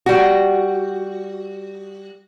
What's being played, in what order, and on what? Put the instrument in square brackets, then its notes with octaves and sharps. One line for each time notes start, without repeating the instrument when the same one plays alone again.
[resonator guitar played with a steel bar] G3 F#4